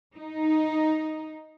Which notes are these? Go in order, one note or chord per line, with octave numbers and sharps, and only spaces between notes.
D#4